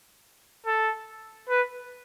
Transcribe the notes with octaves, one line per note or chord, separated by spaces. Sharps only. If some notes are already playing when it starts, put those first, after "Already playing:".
A4
B4